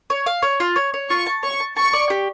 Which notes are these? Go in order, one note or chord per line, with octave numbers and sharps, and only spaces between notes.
C#5
F5
C#5
F4
C#5
C#5
F4 C#6
A5
C#5 C#6
A5
A5 C#6
D5
G4